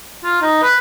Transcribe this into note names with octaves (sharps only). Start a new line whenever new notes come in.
F4
D#4
B4